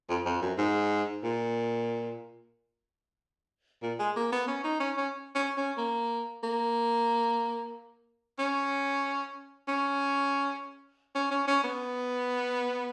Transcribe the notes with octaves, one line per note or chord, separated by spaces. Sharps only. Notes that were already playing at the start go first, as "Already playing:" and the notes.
F2
F2
F#2
G#2
A#2
A#2
G#3
A#3
B3
C#4
D#4
C#4
C#4
C#4
C#4
A#3
A#3
C#4
C#4
C#4
C#4
C#4
B3